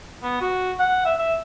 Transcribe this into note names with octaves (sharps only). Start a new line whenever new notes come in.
B3
F#4
F#5
E5
E5